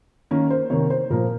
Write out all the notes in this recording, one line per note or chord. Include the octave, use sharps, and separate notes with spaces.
D#3 A#3 C#4 A#4
C5
C3 D#3 A#3 C#5
C5
A#2 F3 A#3 A#4